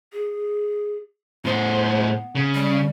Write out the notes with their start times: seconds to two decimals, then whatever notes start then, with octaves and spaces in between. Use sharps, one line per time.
0.13 G#4
1.45 A2 B3 C5
2.35 C#3
2.55 G3